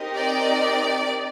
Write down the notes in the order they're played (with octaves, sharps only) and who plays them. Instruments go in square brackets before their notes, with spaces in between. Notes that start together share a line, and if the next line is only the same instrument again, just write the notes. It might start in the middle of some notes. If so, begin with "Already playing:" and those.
Already playing: [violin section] C4 D#4 G4 A#4 D#5
[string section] D5